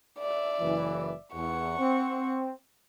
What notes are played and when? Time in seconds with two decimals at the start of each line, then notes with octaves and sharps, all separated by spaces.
0.19 D5 E5
0.60 F#1 E3
1.34 E2 F#5 C#6
1.79 C4